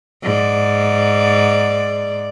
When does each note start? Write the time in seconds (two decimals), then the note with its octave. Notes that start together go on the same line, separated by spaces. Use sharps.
0.23 G#2 D5